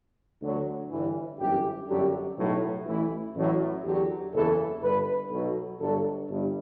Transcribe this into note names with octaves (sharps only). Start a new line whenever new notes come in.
D2 D3 F#3
G1 G2 E3
G1 F#2 E3 G4
G1 F#2 D3 F#3 G4
B1 A2 F#3
A1 A2 E3 E4
A1 A2 F#3
E2 D3 F#3 G4
F#1 E2 C#3 E3 A4
G1 G2 D3 B4
B1 B2 F#3 A4
G1 G2 D3 F#3 A4
G1 G2